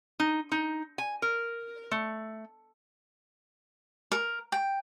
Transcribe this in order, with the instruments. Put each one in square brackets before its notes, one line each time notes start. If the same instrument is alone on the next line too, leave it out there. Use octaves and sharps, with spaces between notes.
[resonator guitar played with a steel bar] D#4
D#4
G#5
A#4
A3
[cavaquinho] A#4
G5